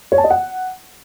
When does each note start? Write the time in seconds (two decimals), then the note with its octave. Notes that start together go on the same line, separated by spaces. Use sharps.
0.12 C#5
0.18 A5
0.24 D#5
0.30 F#5